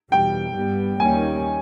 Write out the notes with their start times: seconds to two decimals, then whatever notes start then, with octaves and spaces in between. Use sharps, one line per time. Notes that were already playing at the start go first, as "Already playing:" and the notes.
0.12 E2 B2 G3 G5
0.56 G2 G3 B3
1.00 D#2 D#3 G3 A#3 C#4 G#5